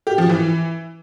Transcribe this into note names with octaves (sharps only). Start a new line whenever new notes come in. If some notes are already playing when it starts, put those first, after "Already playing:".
G4
F3
E3